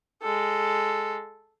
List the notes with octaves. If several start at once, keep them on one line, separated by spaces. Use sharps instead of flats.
G#3 A4